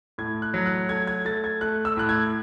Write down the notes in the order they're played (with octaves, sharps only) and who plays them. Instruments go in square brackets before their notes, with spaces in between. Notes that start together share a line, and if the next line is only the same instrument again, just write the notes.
[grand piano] A2 G#6
F#6
F#3
F#6
A3 G#6
G#6
A3 A6
G#6
A3 F#6
E6
A2 F#6
G#6